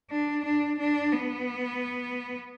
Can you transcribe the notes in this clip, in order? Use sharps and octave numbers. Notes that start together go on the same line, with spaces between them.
D4
D4
D4
B3